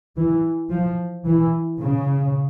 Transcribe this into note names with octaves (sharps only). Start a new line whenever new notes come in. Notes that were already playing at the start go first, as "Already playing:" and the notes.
E3
F3
E3
C#3